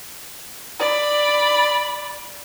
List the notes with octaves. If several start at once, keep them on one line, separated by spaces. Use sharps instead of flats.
D5 B5